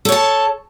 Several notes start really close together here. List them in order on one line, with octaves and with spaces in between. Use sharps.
A4 C#5 A5